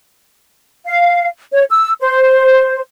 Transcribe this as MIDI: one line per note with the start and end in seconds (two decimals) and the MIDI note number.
0.85 1.27 77
1.53 1.64 73
1.70 1.92 88
2.00 2.81 72